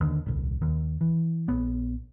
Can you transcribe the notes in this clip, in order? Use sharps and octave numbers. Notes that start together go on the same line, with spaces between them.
D#2 D3
D#1 C2
D#2
E3
A#1 B3